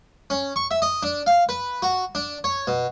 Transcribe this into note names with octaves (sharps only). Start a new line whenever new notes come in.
C#4
C#6
E5
D#5
D4
F5
B4
F#4
D4
C#5
B2